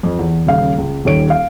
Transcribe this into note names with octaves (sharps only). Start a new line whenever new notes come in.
F2
E2
D#1 C#3 F5
C#2
D#1 D#2 C#5 D7
F5